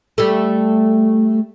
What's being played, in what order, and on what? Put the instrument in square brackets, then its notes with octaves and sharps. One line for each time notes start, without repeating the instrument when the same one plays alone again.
[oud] G3 A3